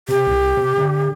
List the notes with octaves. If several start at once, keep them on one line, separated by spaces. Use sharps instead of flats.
C3 G4
C2
C3
D3